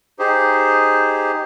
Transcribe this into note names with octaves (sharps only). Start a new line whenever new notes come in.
D#4 G4 G#4 C5